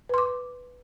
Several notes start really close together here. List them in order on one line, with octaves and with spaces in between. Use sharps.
B4 C6 D6